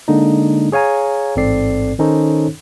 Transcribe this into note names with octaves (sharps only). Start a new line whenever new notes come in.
D3 G#3 A#3 D4 D#4
G#4 C#5 F5 G#5 A#5
A1 G#2 C4 A4 D5 C7
D#3 C#4 D#4 A4 C5 C#5